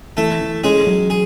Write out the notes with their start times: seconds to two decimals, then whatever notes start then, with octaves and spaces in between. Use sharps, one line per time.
0.17 E3 A3 A4
0.41 E3
0.64 G#3 C#4 G#4
0.87 F#3
1.10 G#4